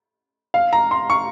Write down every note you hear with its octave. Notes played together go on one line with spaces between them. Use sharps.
F5
A#5
C6
C#6